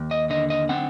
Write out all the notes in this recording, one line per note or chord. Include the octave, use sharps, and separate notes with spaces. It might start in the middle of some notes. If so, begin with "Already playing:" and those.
Already playing: D#2
D#5
D3 D#5
D#5
C4 F#5